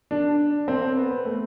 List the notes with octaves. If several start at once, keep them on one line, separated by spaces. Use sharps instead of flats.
D4
C4
B3
A3